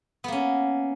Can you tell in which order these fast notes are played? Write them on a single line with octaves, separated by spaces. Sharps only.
B3 A#3 C#4